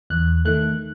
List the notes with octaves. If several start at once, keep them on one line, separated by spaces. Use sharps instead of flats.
E2 F#6
D#3 A3 F#6